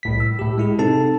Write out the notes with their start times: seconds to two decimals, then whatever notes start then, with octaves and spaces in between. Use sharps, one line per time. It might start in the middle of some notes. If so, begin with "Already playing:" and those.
0.03 C2 A2 B6
0.20 E6
0.39 A2 G4
0.58 G#3 E4 G#4
0.78 C3 C4 D#4 A4 A5